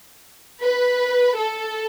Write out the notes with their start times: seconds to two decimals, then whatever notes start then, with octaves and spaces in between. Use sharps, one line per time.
0.62 B4
1.37 A4